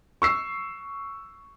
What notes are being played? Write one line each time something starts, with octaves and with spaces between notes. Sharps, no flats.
C#6 E6 C7